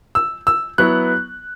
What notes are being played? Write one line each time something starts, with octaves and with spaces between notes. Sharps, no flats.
E6
E6
F#3 B3 E4 F#6